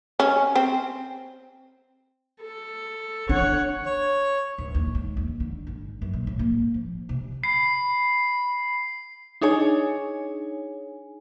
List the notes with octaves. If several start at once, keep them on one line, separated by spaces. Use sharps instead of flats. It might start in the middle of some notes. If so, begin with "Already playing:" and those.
C#4
C4
A4
D4 C#5 F#5
C#5
D1
D#2
G#2
D#2
D3
G#1
F#2
A#2
A2
A#3
F3
C3
B5 C7
D4 D#4 G#4 C#5 G#5